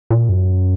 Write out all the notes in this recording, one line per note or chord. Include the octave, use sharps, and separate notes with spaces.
A#2
F#2